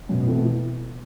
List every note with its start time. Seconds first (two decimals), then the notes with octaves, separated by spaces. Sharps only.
0.09 F#2 B2
0.27 E3 A3 C4 E4
0.44 E3